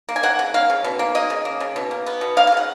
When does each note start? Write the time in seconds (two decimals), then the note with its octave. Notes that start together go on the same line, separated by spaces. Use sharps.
0.09 A#3
0.16 G#5
0.23 A#3 F#5
0.39 C#3
0.54 A#3 F5
0.70 C#3
0.84 B2
0.99 A#3
1.15 A#3 D#5
1.30 C#3
1.45 A#3
1.60 C#3
1.76 B2
1.91 A#3
2.06 B3
2.21 B2
2.37 A#3 F5
2.47 F5
2.52 C#3 F#5